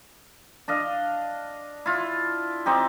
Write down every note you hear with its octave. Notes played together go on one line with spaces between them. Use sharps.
D4 D#5 F5
E4 F4
C4 D#4 G4